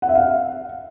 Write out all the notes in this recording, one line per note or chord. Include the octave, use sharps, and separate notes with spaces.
F#5
E5
F5